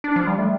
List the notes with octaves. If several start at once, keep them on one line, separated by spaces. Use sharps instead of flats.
D4
F3
G3
A3